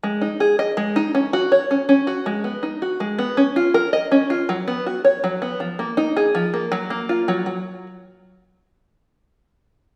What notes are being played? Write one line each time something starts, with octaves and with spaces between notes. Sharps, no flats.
G#3
D#4
G#4
D#5
G#3
D#4
C#4
F#4
C#5
C#4
C#4
F#4
G#3
B3
D#4
F#4
G#3
B3
C#4
F4
A#4
D#5
C#4
F4
F#3
B3
F#4
C#5
F#3
B3
F3
A#3
D#4
G#4
F3
A#3
F#3
A#3
F4
F#3
F#3